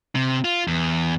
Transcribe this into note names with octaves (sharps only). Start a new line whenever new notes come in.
C3
F4
E2